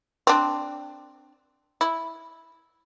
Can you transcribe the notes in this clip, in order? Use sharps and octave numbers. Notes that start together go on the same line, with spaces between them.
C4 D4
E4